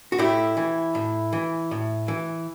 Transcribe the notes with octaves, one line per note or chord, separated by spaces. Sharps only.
F#4
A2 E4 G4
E3
A2
E3
A2
E3